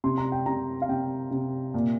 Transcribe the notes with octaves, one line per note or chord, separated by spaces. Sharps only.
C3 C6
A#5
G5
C3 A#5
F5
C3 G5
C3
A#2